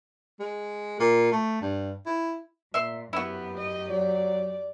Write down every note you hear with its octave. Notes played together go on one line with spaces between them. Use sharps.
G#3
A#2
A3
G2
E4
A#2 E5 C6
F#2 B3 E4 F#4 G4
D#5
F#3 D5